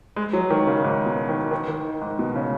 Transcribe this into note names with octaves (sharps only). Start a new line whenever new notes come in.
G#3
F#3
D#3
C#3
G#2
B2
D#3
D#3
D#3
G#2
B2
C#3